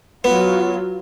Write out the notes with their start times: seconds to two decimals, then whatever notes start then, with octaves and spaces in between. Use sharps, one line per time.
0.24 F#3 B3 F4